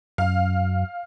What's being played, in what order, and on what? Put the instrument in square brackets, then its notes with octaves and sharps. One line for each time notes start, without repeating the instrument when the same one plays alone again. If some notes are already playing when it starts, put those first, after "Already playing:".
[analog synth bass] F#2 [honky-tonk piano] F5